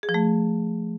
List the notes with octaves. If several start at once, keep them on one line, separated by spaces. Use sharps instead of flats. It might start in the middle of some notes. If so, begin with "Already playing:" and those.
G#4
F3
A3